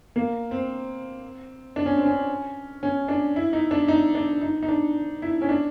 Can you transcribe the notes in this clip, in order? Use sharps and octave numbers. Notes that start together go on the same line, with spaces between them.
A#3
C4
D4
C#4
C4
C#4
C#4
D4
E4
D#4
D4
D#4
D4
D#4
D#4
D4
E4
C#4
D4